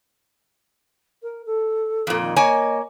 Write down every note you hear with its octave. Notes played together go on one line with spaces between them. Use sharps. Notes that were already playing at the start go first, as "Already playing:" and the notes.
A#4
A4
F2 A#2
D#3
A#3 C#5 D#5 G#5